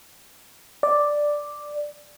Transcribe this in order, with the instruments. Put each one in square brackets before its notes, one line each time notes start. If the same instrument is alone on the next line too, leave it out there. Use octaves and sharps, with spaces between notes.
[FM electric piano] D5